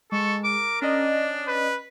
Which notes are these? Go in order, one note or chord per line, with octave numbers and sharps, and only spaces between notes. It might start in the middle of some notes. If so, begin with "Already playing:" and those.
G#3 A4 C#6
A#4 D6
C#4 D4 D5 D#5
B4